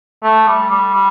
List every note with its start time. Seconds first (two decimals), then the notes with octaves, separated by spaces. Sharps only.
0.23 A3
0.47 G3
0.71 G3
0.94 G3